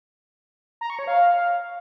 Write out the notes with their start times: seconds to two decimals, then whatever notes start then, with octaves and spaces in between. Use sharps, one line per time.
0.81 A#5
0.90 C#6
0.99 C#5
1.07 F5